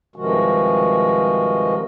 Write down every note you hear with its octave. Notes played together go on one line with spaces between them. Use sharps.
G2 C3 D#3 F3 G#3 F#4